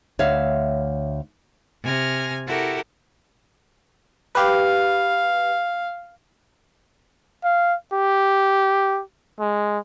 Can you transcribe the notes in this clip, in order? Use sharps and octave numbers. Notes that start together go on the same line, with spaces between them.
D2 C#5 E5 F5
C3 G#5 F6 A#6
E4 F#4 G4 A4 A#4
G4 B4 F5
F5
G4
G#3